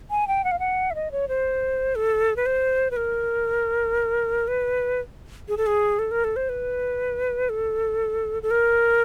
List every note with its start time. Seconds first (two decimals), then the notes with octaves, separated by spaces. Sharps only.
0.11 G#5
0.28 G5
0.44 F#5
0.52 F5
0.59 F#5
0.90 E5
0.95 D#5
1.12 C#5
1.28 C5
1.95 A4
2.36 B4
2.46 C5
2.91 B4
2.96 A#4
4.48 B4
5.48 G#4
5.57 A4
5.67 G#4
5.99 A4
6.11 A#4
6.24 A4
6.36 C5
6.49 B4
7.49 A4
8.43 A4
8.51 A#4